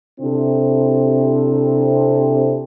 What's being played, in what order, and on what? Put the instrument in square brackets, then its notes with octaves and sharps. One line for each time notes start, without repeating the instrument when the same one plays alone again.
[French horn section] C3 C4 D4 E4 A4